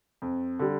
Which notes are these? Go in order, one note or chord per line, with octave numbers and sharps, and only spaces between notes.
F2
D3 G3